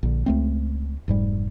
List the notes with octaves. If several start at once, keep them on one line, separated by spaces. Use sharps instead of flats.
A#1 D3
C#2 A3 C4
F1 G#2 G3